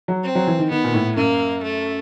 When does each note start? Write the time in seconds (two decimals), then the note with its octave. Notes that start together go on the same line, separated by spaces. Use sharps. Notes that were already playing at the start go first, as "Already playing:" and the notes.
0.08 F#3
0.24 C4
0.35 F#3
0.47 E3
0.59 D#3
0.70 D#3 B3
0.84 A#2
0.94 A2
1.16 F#2 A#3
1.63 A3